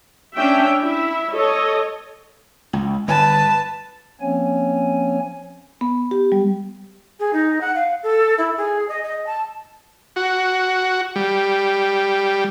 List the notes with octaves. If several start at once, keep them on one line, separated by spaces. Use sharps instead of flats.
C#4 D4 E5 G5
E4 E5
A4 C#5 D#5
C#2
G1 B4 A5
F3 A#3 C4 C#4 C#5 G#5
B3
G4
G3
G#4
D#4
F#5
F5
A4
E4
G#4
D#5
D#5
A5
F#4
G3